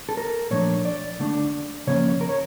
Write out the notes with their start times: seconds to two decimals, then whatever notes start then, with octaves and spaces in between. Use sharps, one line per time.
0.09 A4
0.17 A#4
0.51 A#2 F3 A3 D4 C#5
0.85 D5
1.19 D3 A3 D4
1.87 C#3 F3 A#3 C#4 C#5
2.21 A#4
2.29 C#5